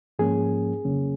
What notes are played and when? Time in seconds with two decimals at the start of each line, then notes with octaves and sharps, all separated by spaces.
0.19 G#2 F3 A#3 C#4 G#4
0.85 F2 C#3 F#3 A#3 C#4